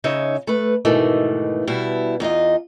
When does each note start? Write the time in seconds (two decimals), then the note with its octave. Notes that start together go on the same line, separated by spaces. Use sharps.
0.04 C#3 D#4 C#5 E5
0.47 A3 B4
0.85 G#2 B2 D#3 E3 A3
1.67 B2 G3 E4
2.20 E2 D#4 F4 D#5